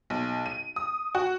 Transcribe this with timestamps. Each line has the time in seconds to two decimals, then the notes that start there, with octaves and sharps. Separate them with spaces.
0.10 B1
0.46 D#7
0.76 D#6
1.15 F#4